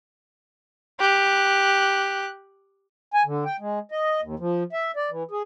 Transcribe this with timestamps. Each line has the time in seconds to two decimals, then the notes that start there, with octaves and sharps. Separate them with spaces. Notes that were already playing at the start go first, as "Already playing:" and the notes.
1.00 G4 F#6
3.14 G#5
3.26 D3
3.45 G5
3.60 G#3
3.91 D#5
4.22 D#2
4.39 F3
4.73 E5
4.96 D5
5.11 E3
5.31 G#4